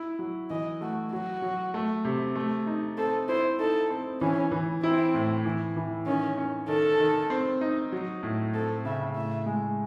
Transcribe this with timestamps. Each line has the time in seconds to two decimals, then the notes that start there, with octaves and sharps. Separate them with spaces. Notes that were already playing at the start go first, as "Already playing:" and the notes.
Already playing: E4
0.19 F#3
0.50 E3 D#5
0.81 A3 F#4
1.12 F#3 F#4
1.42 F#3
1.74 A3
2.04 C3
2.35 A3
2.67 D#4
2.97 C4 A4
3.29 E4 C5
3.59 D#4 A4
3.90 C4
4.21 E3 C#4
4.52 E3
4.83 C4 E4
5.14 A2
5.45 E3
5.76 E3
6.06 D#3 C#4
6.37 C#4
6.68 D#3 A4
7.00 D#3
7.30 C4
7.61 D#4
7.92 F#3
8.23 A2
8.53 C4 A4
8.85 C#3 E5
9.16 A2 E5
9.46 G#3